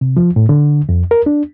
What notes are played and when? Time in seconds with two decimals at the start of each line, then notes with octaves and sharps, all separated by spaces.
0.01 C3
0.17 F3
0.36 A2
0.49 D3
0.89 F2
1.11 A#4
1.26 D4